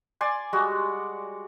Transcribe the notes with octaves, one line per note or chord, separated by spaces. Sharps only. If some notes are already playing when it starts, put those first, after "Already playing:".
D5 G#5 C6
G3 G#3 F#4